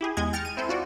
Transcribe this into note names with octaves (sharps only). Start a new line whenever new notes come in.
E4 G4 G#4
E2 G#3 D#5 G#5 G#6
G5 F6 A6 A#6 C#7
D#7
C4 E4 A4 C5
F4 F#4 D5